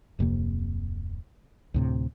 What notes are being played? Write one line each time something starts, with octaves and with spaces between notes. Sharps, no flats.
D1 F2 C3 A#3
D2 A2 C3